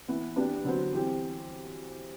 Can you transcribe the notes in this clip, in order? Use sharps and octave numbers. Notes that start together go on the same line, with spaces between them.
E3 B3 E4
E3 B3 D4 G4 B4
D3 F#3 B3 F#4 C5
E3 G3 C4 G4